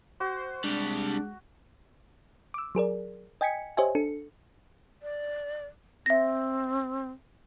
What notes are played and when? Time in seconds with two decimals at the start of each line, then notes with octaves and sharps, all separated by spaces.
0.20 F#4 C5
0.64 C3 G3 G#3 D4
2.54 D6 E6
2.75 F#3 G#4 A#4 D5
3.41 D#5 G5 G#5 G#6 B6 C#7
3.77 G4 C5 C#5 D#5 E5 G#5
3.95 D4 A4 C#7
5.03 D5
6.06 C4 E5 A#6